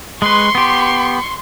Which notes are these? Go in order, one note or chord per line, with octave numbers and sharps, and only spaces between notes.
G#3 B4 C6 C#6
B3 G4